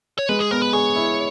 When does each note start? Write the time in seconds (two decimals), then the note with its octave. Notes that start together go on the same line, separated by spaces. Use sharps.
0.19 C#5
0.29 G#3 B4
0.40 G#4
0.51 B3 A#4
0.62 B4
0.73 G#4 C#5
0.96 E4